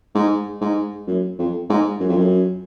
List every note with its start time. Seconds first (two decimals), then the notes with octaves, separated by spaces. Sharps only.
0.15 G#2
0.61 G#2
1.07 F#2
1.38 F2
1.69 G#2
2.00 F#2
2.09 F2
2.17 F#2